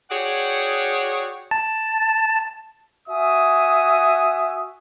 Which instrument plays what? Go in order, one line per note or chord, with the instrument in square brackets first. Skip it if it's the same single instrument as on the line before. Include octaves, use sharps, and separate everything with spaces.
[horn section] F#4 G#4 C#5 D5 F#5 G5
[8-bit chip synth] A5
[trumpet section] F#4 E5 G#5 D#6